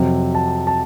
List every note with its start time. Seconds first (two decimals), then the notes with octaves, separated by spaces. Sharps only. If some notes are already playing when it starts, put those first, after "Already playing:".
Already playing: F2 C3 F#3
0.35 A5
0.67 A5